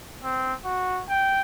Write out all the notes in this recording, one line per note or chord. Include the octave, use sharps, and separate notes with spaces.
C4
F#4
G5